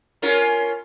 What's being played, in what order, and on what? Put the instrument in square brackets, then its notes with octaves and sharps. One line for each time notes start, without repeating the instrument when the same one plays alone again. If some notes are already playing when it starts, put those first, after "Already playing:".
[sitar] C#4 F4 A#4